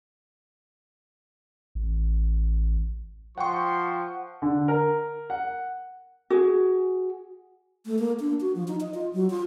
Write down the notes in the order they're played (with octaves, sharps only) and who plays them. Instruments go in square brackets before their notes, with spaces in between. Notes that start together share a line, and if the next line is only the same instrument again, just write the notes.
[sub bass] A1
[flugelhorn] F3 [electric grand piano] F#5 G5 C#6 [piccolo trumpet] C6
[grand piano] D3
A#4
F#5
[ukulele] F#4 G#4
[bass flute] A3
A#3
D4
F#4
F3
D#4
D#5
F4
F#3
F4